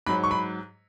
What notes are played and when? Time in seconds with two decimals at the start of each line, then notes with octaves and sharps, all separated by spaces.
0.06 G#2 F#3 B5
0.24 C#6
0.31 B5